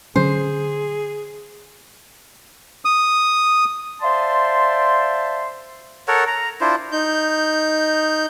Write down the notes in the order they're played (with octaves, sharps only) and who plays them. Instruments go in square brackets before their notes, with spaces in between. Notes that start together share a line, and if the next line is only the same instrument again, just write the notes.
[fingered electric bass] D3 F#3 C#4 [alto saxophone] G#4 [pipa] C5
[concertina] D#6
[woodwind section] C5 D5 E5 F5 A5 C6
[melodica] A4 A#4 C#5 F#5
A#5
D4 E4 F4 C5
[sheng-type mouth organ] D#4 G6